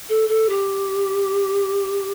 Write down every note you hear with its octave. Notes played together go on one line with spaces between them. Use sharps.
A4
A4
G4